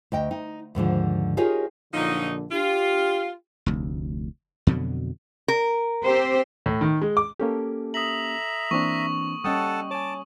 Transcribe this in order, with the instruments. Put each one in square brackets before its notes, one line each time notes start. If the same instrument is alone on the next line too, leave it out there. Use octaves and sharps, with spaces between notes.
[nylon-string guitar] D2 D#5 G5
D#4
D#2 G#2 D3 F3
D#4 F4 G4 G#4 A#4 C#5
[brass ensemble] A#1 D3 [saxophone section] F3 F#3 D#4
[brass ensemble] D4 G4 [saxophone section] F4
[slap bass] F1 D2
F2 B2 D3 F#3
[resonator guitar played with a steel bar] A#4
[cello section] C4 G4 C5
[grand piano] A2
D#3
G#3
D6
[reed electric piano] A#3 C#4 G4 [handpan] A4
[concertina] E5 A#5 [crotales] D#6 F#7
[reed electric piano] E3 C4 D4 [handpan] A#3 [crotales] C#6
[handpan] G3 C#4 [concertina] A4 F#5 A5 [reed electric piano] D#5 G5 D#6
[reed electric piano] C#5 G#5 [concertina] A5 D6